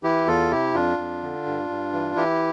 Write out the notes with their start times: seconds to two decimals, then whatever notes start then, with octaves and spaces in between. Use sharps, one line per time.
0.03 E3 E4 G4
0.27 E2 F4 A4
0.51 C3 E4 G4
0.74 F2 D4 F4
0.98 F2
1.22 D3
1.46 G2
1.69 G2
1.93 E3
2.16 E3 E4 G4